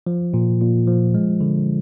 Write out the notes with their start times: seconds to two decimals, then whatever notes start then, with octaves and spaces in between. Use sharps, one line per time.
0.07 F3
0.34 A#2
0.61 A#2
0.87 F3
1.14 G#3
1.41 D3